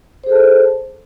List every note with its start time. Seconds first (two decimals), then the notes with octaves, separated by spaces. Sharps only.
0.24 C5
0.26 G#4
0.29 A4
0.32 A5